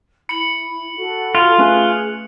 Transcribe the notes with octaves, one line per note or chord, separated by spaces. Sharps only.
E4 B5 C#7 F#7
F#4 A4
F4
A3 C#4 G#4 B4 F#6